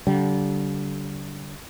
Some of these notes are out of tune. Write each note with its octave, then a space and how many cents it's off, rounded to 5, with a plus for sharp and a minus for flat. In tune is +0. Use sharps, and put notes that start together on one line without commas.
D3 -35 G3 -35